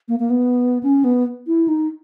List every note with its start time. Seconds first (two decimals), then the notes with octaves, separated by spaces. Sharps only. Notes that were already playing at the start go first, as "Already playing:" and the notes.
0.08 A#3
0.19 A#3
0.30 B3
0.83 C#4
1.04 B3
1.47 E4
1.68 D#4